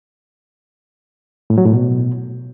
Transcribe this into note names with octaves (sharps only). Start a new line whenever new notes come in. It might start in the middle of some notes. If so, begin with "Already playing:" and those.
A2
F#3
A2
B2